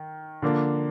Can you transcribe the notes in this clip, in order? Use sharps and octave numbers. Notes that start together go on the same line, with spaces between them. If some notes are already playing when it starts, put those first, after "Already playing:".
Already playing: D#3
D3 F3 A#3 D4